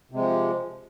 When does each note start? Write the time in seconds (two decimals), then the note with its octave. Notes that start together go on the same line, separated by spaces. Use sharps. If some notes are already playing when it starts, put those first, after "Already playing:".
0.11 C3
0.15 G#3
0.19 F3